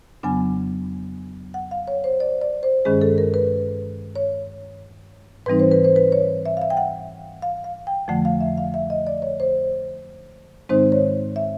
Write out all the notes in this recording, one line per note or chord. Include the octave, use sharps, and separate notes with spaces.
F2 C#3 F#3 B3 D4 G#5
F#5
F5
C#5
C5
D5
D5
C5
G2 D#3 G#3 C#4 G#4
A4
A#4
B4
C#5
G#2 E3 G3 C4 D#4 B4
C5
B4
C5
B4
C#5
E5
F5
E5
G5
F#5
F5
F5
G5
F2 D3 F3 A3 F#5
F5
E5
F5
E5
D#5
D5
C#5
C5
G#2 D#3 G#3 C4 D#4 C5
C#5
E5